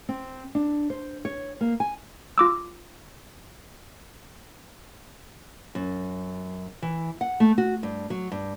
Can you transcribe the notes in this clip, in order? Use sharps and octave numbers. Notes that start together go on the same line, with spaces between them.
C4
D4
C5
C#5
A#3
G#5
F4 D6 E6
F#2
E3
F#5
A3
F#4
G2
F#3
G2